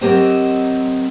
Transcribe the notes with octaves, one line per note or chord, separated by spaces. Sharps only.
F#3 C4 G4 A#4 C5 D#5